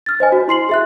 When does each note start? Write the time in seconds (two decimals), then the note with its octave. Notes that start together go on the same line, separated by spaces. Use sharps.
0.06 F6 A6
0.20 C5 D#5 G#5
0.32 F#4
0.48 E4 C6 C7 F#7
0.69 G#4 E5 F#6